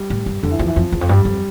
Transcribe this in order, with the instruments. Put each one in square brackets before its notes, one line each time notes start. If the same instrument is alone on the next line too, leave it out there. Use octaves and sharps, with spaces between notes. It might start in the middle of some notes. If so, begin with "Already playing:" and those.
Already playing: [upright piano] G3
[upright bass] A2
G2
[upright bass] F2 [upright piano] D3
[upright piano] E3
[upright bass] E2 [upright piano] F3
[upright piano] E3
[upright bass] F2 [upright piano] F3
[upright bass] E2
F2
[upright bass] G2 [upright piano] G3
[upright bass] F2